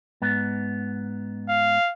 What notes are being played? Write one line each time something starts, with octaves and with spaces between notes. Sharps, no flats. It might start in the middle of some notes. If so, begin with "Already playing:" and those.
G#2 B3
F5